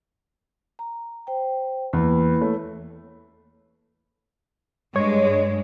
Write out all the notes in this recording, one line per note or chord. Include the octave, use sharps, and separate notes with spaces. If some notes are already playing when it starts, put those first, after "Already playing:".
A#5
C5 G5
E2 A#3 E4 B5
A3 C#5
G2 G#3 C#5